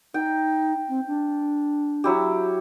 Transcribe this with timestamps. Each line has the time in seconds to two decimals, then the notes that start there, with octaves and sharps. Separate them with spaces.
0.14 D#4 G5
0.89 C4
1.07 D4
2.04 F#3 E4 G4